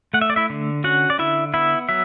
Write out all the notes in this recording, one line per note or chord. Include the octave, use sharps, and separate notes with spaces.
A3 F#5
E5
D5
E4 E5
D3
C#4 F#4 F#5
D5
D3 E4 E5
B3 E4 E5
F#3 E5